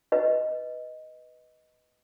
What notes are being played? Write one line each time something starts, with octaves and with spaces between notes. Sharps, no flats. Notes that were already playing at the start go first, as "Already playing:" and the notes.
B4 D#5